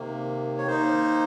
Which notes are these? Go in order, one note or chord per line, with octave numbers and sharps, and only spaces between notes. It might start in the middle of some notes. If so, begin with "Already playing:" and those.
Already playing: C3 D#3 A#3
C#5
D#3 A#3 D#4 C5